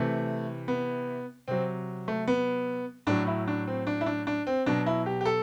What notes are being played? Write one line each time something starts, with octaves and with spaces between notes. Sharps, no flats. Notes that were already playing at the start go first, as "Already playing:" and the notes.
Already playing: C3 E3 A3
B3
C3 F#3 C4
A3
B3
A2 F#3 D4
E4
D4
C4
D4
E4
D4
D4
C4
B2 F#3 D4
E4
G4
G4
A4